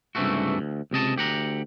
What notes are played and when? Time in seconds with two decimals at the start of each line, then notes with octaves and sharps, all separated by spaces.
0.15 C#2 G2 C3 E3 A3 F#4
0.59 D2
0.91 C#2 C3 D#5 A5
1.16 D2 G4 F#5 A#5